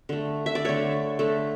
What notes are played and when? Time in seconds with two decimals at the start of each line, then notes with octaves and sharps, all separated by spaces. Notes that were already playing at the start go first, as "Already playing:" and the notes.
0.09 D3 A3
0.46 E5
0.55 D5
0.65 D3 A3 C#5
1.19 D3 A3